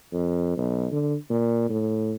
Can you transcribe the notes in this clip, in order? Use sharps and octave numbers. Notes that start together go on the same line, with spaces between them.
F2
B1
D3
A#2
A2